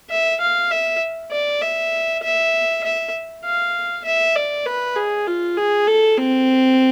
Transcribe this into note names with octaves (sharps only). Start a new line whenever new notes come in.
E5
F5
E5
D5
E5
E5
E5
F5
E5
D5
B4
G#4
F4
G#4
A4
C4